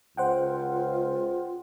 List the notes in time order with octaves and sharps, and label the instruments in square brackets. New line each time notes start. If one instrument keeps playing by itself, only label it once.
[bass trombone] C#2 [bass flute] F4 [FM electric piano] C5 F#5 G5